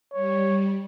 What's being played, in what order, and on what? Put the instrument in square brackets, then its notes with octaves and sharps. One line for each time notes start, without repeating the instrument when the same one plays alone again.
[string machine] G3 [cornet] C#5